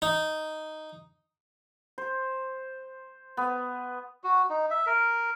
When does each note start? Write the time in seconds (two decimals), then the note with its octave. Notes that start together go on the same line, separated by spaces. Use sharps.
0.02 D#4
1.98 C5
3.37 B3
4.24 F#4
4.50 D#4
4.70 E5
4.86 A#4